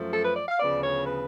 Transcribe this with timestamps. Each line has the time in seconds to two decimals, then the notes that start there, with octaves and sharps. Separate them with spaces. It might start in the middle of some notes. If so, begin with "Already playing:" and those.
Already playing: F#2 F3 A3
0.14 A4
0.25 B4
0.36 D5
0.49 F5
0.60 D2 C#3 F3 B3 D5
0.83 C#5
1.07 B4